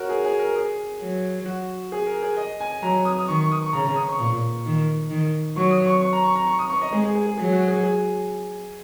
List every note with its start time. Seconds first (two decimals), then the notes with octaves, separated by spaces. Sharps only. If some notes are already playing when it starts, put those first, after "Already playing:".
Already playing: F#4 A#4 C#5
0.09 G#4
0.25 G#4
0.39 A#4
0.56 G#4
1.00 F#3
1.46 F#4
1.92 G#4
2.06 A#4
2.22 G#4
2.37 D#5
2.61 G#5
2.82 F#3 A#5
3.05 D#6
3.19 D#6
3.28 D#3 C#6
3.40 C#6
3.52 D#6
3.62 C#6
3.73 C#3 A#5
3.85 A#5
3.96 D#6
4.08 C#6
4.19 A#2 C#6
4.65 D#3
5.10 D#3
5.56 F#3 C#6
5.71 D#6
5.86 C#6
6.01 C#6
6.13 A#5
6.24 C#6
6.36 A#5
6.47 C#6
6.59 D#6
6.70 C#6
6.82 D#5
6.92 G#3 G#4
7.03 G#4
7.15 G#4
7.27 G#4
7.38 F#3 G#4
7.53 F#4
7.68 G#4
7.83 G#4